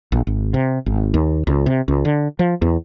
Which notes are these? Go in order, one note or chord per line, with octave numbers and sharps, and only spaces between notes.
A#1
G#1
C3
G#1
D#2
C#2
C3
C#2
D3
F3
E2